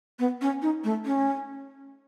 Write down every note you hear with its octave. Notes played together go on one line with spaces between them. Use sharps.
B3
C#4
D#4
A3
C#4